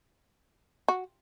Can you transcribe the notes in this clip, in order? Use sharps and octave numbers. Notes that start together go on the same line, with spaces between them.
F#4